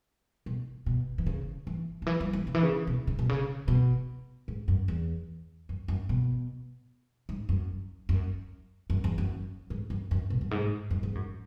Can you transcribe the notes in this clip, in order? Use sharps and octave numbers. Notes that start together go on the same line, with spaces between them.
B2
B2
E3
C#3
E3
C#3
E3
F#3
E3
C#3
E3
C#3
B2
C#3
B2
C#3
B2
G#2
F#2
E2
F#2
F#2
B2
G#2
F#2
F#2
F#2
E2
F#2
G#2
F#2
F#2
B2
F#2
G#2
F#2
G#2
F#2